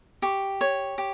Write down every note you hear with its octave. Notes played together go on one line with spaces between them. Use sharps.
G4 C#6
C#5
G4